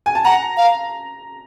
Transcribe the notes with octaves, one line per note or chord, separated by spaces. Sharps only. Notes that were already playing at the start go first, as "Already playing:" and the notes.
G#5
A5
F#5 A#5
F5